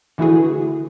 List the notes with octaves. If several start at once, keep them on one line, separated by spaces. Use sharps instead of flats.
D3 E3 A3 E4 F#4 G#4